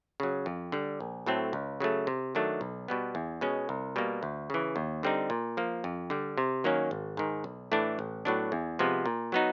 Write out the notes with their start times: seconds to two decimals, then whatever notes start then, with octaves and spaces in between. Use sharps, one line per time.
0.20 C#3 F#3
0.46 F2
0.72 D3 G3
1.00 A#1
1.26 A2 F#3 A3 C4
1.53 C#2
1.80 C#3 F#3 A3
2.07 C3
2.35 D#3 F#3 A3 D4
2.61 B1
2.88 B2 G3 B3
3.15 E2
3.41 B2 G#3 C#4
3.69 C2
3.96 B2 G3 A#3
4.23 D2
4.50 C#3 E3
4.76 D#2
5.03 D3 G3 C4 D#4
5.30 A#2
5.57 F3 A#3
5.84 F2
6.10 D3 G3
6.38 C3
6.64 D#3 F#3 A#3 C#4
6.91 G#1
7.17 G#2 D#3
7.44 B1
7.72 A2 E3 A3 D4
7.99 A1
8.25 A2 F#3 B3 D4
8.52 E2
8.79 C3 F3 G#3 B3
9.06 A#2
9.32 F#3 B3 D#4 F#4